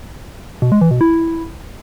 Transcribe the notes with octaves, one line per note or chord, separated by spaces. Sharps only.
B2
G#3
E3
B2
E4